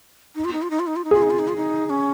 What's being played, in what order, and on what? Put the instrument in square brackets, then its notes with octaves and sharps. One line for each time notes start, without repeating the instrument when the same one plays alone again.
[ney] D#4
F4
D#4
F4
D#4
F4
D#4
F4
D#4
[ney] F4 [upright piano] G#4
[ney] D#4
F4
D#4
F4
D#4
D#4
C#4